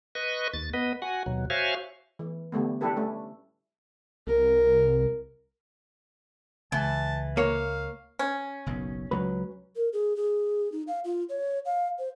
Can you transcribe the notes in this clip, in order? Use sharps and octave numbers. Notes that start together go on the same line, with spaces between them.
B4 D#5 C#6
D#2 A6
B3 B4 D#5
F#4 F#5 G#5
D#2 B2 F#3
F#4 C5 C#5 E5 F5 G#5
E3
D3 G3 A3 B3
G3 D4 E4 G4 A4 B4
A3 C#4
C2 A#4
C#2 E3 A5
A#3 C#5 F5
C#4
F#1 B1 B2
C#2 F#3 B4
A#4
G#4
G#4
D#4
F5
F4
C#5
F5
C5